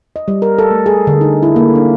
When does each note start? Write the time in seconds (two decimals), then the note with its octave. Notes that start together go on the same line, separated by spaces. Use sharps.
0.16 D#5
0.28 G3
0.42 A#4
0.58 A4
0.71 A3
0.86 G#4
1.07 D3
1.21 D#4
1.43 E4
1.56 A#3
1.75 D4